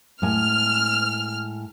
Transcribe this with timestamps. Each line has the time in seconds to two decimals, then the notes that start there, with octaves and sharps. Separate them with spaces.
0.22 A2 G#3 G#5 F6